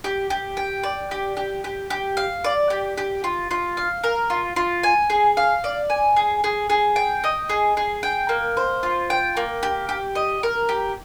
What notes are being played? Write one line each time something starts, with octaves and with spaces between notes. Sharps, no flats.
G4
G4
G5
D5
G4
G4
G4
G4
F5
D5
G4
G4
F4
F4
F5
A#4
F4
F4
G#5
G#4
F5
D5
G#5
G#4
G#4
G#4
G5
D#5
G#4
G#4
G5
A#3
C5
F4
G5
A#3
G4
G4
D#5
A#4
G4